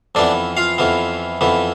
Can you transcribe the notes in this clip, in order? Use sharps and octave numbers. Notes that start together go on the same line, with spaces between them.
F2 E3 B3 D4 D5
F4 F5
F2 E3 B3
F2 E3 B3